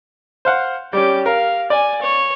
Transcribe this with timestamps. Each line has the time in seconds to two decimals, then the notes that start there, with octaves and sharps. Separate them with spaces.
0.45 C5 F5 F#5
0.93 G3 C#4 G4 D6
1.26 A#4 F5
1.70 D5 G#5
2.01 C#5